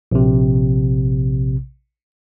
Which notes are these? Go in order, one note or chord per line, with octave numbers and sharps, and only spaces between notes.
A#1 C3